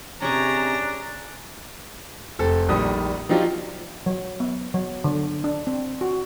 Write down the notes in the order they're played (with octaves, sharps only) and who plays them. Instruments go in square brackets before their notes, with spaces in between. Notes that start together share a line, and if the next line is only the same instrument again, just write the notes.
[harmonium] C3 [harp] C#4 G#4 [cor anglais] D4 [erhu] A#5
[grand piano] F1 A4 C5
A#1 D#3 G3 D#6
F3 F#3 D4 D#4 F4 G4
[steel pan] F#3
B3
F#3
D3
D4
C4
F#4